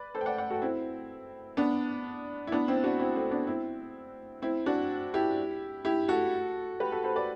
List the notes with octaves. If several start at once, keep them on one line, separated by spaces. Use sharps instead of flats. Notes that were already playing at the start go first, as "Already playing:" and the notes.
Already playing: B4 D5
A4 C5
G5
D5 F#5
D5 F#5
F#4 A4
C4 E4
B3 D4
E4
B3 D4
C4 E4
D4 F#4
C4 E4
A3 C4
B3 D4
C4 E4
C4 E4
D4 F#4
E4 G4
E4 G4
F#4 A4
G4 B4
F#4 A4
A4 C5
B4 D5